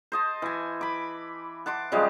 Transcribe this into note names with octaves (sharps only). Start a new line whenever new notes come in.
C5 D#5 A5
E3 G#5
B5 D6
F#5 A5 C6 D6
C#3 F3 G3 G#3